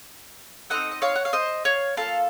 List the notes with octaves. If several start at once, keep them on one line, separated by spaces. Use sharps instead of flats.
C4 D#4 F#4 A4 D#5 F#5
D#5
C#5 F5
F#5
F5
C5 D#5
C#5 F5
A#3 F4 A4 F5 A5